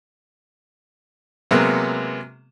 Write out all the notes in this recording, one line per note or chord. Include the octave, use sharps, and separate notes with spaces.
C3 F#3 G#3 A#3 B3